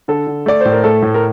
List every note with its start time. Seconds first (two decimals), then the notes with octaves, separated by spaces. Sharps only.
0.08 D3 A4
0.27 D3
0.46 A3 D5
0.61 A2 C5
0.72 A#4
0.84 A3 A4
1.02 A2
1.14 A#4